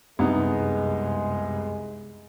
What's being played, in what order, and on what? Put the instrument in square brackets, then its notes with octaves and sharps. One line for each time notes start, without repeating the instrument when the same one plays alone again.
[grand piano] C2 B3 D#4 [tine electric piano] F#2 C3 [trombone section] G#3